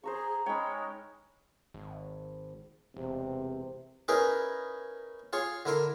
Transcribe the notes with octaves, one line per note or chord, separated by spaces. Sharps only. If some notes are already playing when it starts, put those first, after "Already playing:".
G#4 C5 A#5 C#6
G#3 C#4 D#4 C#5 G5 B5
G#1
E1 C3
C#4 D#4 E4 G#4 A#4 B4
F4 G#4 C#5
D3 E4 A#4 C6